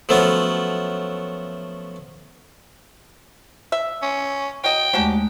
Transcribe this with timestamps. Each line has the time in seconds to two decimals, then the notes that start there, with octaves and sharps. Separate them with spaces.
0.09 F3 F#3 A3 B3 C#4 F4
3.72 E5
4.02 C#4
4.64 F#3 D#5 G5
4.93 D#2 F#3 G#3 A3 D4 G4